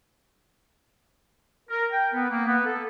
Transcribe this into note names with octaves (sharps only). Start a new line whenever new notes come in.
A#4
G5
B3
A#3
B3
A4